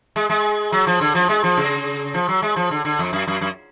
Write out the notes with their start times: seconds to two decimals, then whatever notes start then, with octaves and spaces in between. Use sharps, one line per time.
0.16 G#3
0.30 G#3
0.72 F#3
0.87 F3
1.01 D3
1.15 F3
1.29 G#3
1.44 F3
1.57 C#3
2.14 F3
2.28 F#3
2.42 G#3
2.56 F3
2.71 D3
2.85 D3
2.99 F2
3.13 F#2
3.28 F#2
3.41 F#2